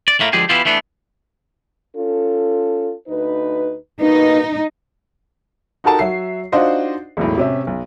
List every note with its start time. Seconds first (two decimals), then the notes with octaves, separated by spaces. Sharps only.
0.08 D5
0.20 A2 A3 A#3
0.33 D3 F3 G#3 G4 G#4
0.49 E3 B3 E4 F4 G4
0.65 E3 A3 B3 D4
1.96 C#4 F4 A4
3.08 D2 D#4 B4
4.01 B2 A#3 D#4 B4
5.84 D#4 F#4 G4 A4 A#4 A5
5.99 F#3 E5 F#5 C7
6.52 D4 D#4 F4 F#4 C5 D#5
7.17 E1 B1 A2
7.37 C3 C#4 E5
7.67 B1